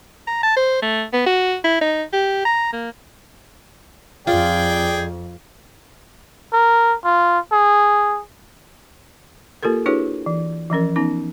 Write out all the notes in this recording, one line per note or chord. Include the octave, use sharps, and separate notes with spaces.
A#5
A5
C5
A3
B3
F#4
E4
D#4
G4
A#5
A#3
F2 F4 G#4 D5 G5
A#4
F4
G#4
A#3 F4 G4 A4 A#4
D4 E4 F#4 G#4 B4 C#5
E3
E3 F3 C#4 A#4
B3 C#4 D#4